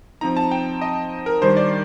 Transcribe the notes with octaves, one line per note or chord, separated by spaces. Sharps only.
F3 C4 D#4 A#5
A5
G5
D#5
A#4
D#3 G3 D4 C5
D5